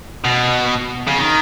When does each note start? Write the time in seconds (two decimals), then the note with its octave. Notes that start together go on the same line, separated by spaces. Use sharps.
0.25 B2
1.08 C#3
1.19 D#3